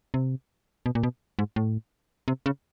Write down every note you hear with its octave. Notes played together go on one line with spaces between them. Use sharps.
C3
B2
A#2
B2
G#2
A2
C3
C#3